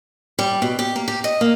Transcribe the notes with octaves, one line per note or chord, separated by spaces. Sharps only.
G3
B2
G4
A#3
G4
D#5
A#3